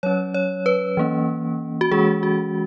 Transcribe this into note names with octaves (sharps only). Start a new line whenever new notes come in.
F#3 C#4 C#5
C#5
B4
E3 A#3 C#4
F#4
E3 G#3 C#4 G#4
F#4